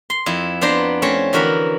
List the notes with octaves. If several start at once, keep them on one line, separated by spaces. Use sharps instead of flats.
C6
F2 E4
B3 D4 C5 A#5
A3 C4 C#4 C#5
D3 E3 F#4 A#4 F#5 B5